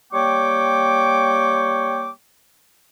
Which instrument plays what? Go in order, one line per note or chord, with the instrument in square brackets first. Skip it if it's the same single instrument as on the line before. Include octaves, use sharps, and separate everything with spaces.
[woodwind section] G3 A#3 C#5 G5 C#6 D6